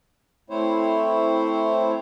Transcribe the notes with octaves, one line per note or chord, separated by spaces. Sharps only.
A3 C4 E4 C5 C#5